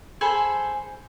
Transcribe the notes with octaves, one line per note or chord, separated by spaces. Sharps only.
G#4 A4 C5 B5